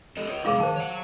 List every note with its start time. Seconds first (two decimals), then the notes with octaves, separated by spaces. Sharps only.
0.17 G4 A4 D#5
0.28 G#4 C#5 D#5
0.45 C3 G#3 E4 G#4 F5 D6
0.60 D#3 C5 A5
0.76 C#5 F#5